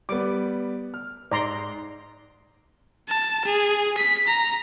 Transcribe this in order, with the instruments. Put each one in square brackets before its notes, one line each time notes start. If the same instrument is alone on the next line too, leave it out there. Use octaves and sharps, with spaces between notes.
[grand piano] G3 B3 [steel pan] D6
[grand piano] F6
[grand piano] G#2 [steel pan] D5 A#5 C6
[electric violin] A5
G#4
B6
A#5